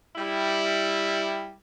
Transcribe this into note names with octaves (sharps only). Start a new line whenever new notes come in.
G3 E4